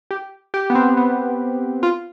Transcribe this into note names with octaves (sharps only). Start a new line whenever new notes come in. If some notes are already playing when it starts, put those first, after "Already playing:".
G4
G4
B3
C4
B3
F4